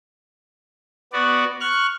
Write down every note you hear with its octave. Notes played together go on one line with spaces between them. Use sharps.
B3 F#4 D5
C#6 F6 F#6